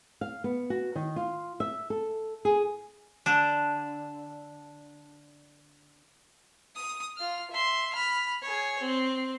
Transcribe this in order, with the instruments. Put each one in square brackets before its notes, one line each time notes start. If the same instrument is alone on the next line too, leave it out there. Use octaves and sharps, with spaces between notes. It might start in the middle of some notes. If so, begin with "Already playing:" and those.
[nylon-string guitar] F5
B3
F#4
D#3
F4
E5
A4
G#4
[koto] D3 D4
[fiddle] D#6
F4 F6
E5 C6
B5 F6
G#4 C#5
C4